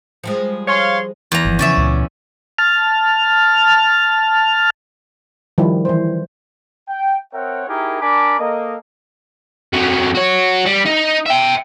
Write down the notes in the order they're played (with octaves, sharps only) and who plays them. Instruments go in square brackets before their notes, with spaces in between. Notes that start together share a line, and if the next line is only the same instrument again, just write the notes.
[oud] F3 G3 G#3
[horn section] C#5 F5 C6
[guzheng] E2 A#5
[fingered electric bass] G1 A#2 F3
[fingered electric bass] C#3 F3 [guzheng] C#4 D5 E5
[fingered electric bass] C#2 A#2 C#3
[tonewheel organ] A5 F6
[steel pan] D#3 F3 G3 E4
E3 C5
[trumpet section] G5
C4 A#4 C#5 E5 F#5 G5
D#4 E4 G4 G#4 A#4
D4 A#4 G#5 A5 B5 D6
A#3 A4 D#5
[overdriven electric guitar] F2 F#3
F#4 C#5
G3
D#4
E5 G5